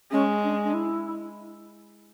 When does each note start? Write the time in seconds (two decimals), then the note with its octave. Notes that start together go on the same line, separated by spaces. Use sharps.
0.11 G#3 C#4
0.43 D4
0.64 D4
0.73 E4